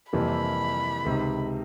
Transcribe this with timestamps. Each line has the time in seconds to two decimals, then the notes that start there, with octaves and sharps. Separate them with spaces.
0.13 F2 C3 E3 G3 A#3 B5
1.05 C#2 C3 D#3